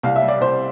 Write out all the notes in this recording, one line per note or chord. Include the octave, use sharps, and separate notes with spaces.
C2 F5
E5
G3
D5
C2 C5